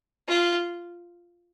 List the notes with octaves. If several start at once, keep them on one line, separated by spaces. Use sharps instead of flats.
F4